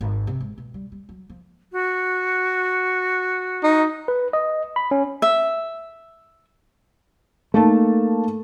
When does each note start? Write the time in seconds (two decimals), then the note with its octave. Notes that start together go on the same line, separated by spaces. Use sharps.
0.01 G#1
0.27 C3
0.41 G#2
0.58 B2
0.74 G3
0.92 G3
1.09 F#3
1.30 F3
1.72 F#4
3.63 D#4
4.08 B4
4.33 D#5
4.76 B5
4.91 C#4
5.22 E5
7.54 A3 A#3 D#4 A5